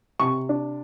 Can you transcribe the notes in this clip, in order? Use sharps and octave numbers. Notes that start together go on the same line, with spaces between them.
C3 C#6
D4